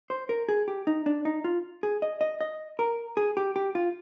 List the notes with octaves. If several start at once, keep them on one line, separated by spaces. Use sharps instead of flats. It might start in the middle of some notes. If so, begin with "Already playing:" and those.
C5
A#4
G#4
G4
D#4
D4
D#4
F4
G#4
D#5
D#5
D#5
A#4
G#4
G4
G4
F4